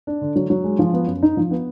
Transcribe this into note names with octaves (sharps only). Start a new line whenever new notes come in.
D4
D3
F#3
F#3
G#3
F3
B3
F#2
D#4
F3
B3